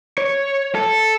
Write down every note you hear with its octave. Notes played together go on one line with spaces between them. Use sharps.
C#5
A4